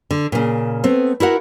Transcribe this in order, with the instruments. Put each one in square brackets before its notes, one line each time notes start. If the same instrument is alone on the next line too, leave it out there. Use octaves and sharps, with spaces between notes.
[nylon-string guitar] D3
A#2 C#3
A3 B3 C4
E4 F#4 A#4 F#5